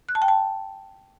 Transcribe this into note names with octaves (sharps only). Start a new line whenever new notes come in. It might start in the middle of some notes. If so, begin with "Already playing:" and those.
F#6
A5
G5
A5